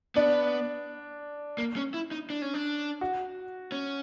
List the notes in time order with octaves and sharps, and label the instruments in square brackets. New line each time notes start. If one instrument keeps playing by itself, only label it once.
[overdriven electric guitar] B3 [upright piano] D4
[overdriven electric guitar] A#3
C#4
E4
D#4
D4
C#4
D4
[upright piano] F#4
[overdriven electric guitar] C#4